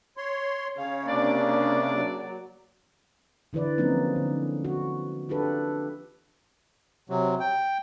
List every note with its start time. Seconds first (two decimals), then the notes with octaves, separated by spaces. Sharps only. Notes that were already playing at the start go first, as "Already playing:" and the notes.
0.17 C#5 C6
0.78 C#3 C#5 F5
1.08 C3 A#3 D4 D5
1.98 F#3
3.53 D3 E3 E4 B4 D5
3.78 F3 F#3 A#3 C4 C#4 D#4
4.16 D3
4.64 F#4
5.29 D4 F4 G4 A4 B4
7.09 C3 F#3
7.40 G5